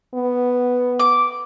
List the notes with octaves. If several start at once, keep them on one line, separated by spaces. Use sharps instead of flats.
B3
D6